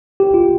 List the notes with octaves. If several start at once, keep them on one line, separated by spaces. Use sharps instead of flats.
G4
F4